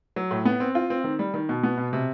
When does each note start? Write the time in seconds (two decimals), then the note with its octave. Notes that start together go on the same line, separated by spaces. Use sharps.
0.16 F#3
0.31 A2
0.45 B3
0.60 C4
0.75 F4
0.90 C4
1.04 D#3
1.19 G3
1.34 D#3
1.49 B2
1.63 B3
1.77 B2
1.93 C3